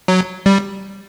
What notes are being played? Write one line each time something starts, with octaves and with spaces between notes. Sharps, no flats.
F#3
G3